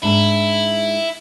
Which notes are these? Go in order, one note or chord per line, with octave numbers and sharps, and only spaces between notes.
G#2 D4 E4